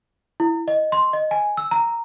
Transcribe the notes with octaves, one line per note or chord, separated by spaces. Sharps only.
E4
D#5
C6
D#5
G#5
E6
A#5